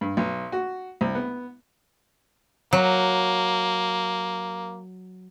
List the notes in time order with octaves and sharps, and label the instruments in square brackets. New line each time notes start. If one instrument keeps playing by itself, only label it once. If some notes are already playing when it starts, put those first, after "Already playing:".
[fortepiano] G2
B1
F#4
C2
B3
[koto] F#3 [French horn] A#3